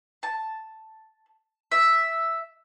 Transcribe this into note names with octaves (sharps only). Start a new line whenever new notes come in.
A5
E5